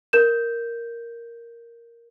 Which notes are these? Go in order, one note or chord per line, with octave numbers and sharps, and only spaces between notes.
A#4 G6 E7